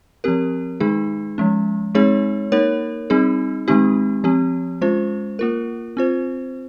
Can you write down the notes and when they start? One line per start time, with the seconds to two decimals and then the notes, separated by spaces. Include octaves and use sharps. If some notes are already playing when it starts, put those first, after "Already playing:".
0.24 F3 C4 G4 A#4
0.80 D#3 G#3 D#4 G#4
1.38 F3 G#3 C#4
1.95 G#3 C4 D#4 G#4 C#5
2.52 A#3 D#4 A#4 C#5
3.10 G3 C4 D#4 G#4
3.68 D#3 G#3 C4 D#4 G4
4.24 F3 C4 G4
4.81 G#3 C#4 F4 C5
5.39 A#3 F4 A#4
5.97 C4 F4 C5